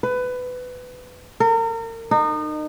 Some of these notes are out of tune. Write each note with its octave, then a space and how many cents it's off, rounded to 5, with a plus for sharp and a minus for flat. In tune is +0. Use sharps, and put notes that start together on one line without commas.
B4 +20
A#4 -35
D#4 -30